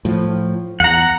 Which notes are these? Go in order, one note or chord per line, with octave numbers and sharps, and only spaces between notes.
A2 F3
E2 F#5 A#5